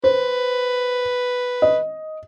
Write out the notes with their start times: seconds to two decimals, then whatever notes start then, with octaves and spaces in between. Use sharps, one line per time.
0.04 B4 C5
1.62 D#5